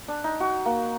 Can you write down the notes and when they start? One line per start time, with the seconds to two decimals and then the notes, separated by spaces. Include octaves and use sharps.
0.08 D4
0.24 D#4
0.40 F#4
0.65 A#3